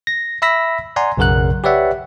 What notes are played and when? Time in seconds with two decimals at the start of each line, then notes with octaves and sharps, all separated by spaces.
0.07 A#6
0.42 E5 B5 E6 A#6 B6
0.96 D5 F#5 G#5 A#5 C6
1.17 B1 F#2 C#3 A#4 F#5 F#6
1.64 G4 B4 C#5 D5 E5 F#5